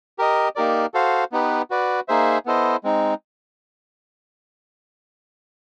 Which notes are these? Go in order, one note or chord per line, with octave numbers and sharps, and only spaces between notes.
G4 A#4 D#5
A#3 D#4 G4 A#4 D5
F#4 A4 C5 F5
B3 D#4 G4 B4
F#4 B4 D5
A#3 D#4 G#4 C5 E5
B3 E4 A4 C5 D#5
G#3 C4 D#4